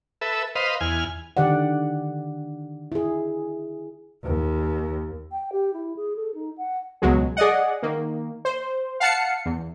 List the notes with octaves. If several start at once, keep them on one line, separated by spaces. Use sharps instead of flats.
A4 B4 E5
B4 C5 D#5 F5
E2 G#5 F6
D3 D#3 G4 D5 F#5
E4 G#4
D#2
G5
G4
E4
G#4
A4
D#4
F#5
C#2 B2 F#3 G#3
G#4 D5 D#5 F#5
D#3 A#3
C5
F5 F#5 A5 C7 C#7
E2